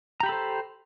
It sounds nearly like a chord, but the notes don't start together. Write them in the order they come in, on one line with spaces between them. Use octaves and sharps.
A#5 G4 B5 A4 C5